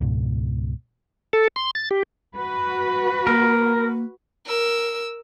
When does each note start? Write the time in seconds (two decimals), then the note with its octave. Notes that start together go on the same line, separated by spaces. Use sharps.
0.01 C#2 G#2 B2
1.33 A4
1.56 C6
1.75 A6
1.91 G4
2.36 F#4 B4
3.27 A#3 A#4
4.45 A#4 E6